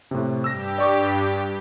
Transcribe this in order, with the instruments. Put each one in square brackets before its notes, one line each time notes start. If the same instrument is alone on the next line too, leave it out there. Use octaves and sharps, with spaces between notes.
[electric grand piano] A2 C3
[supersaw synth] G2 G4 [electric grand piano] E6 A#6
[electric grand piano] D5 C#6 D6